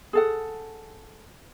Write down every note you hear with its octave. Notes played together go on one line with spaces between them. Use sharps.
G#4 A4 F#5